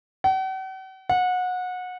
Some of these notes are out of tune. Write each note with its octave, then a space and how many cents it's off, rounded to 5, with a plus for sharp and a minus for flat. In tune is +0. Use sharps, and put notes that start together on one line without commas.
F#5 +45
F#5 -25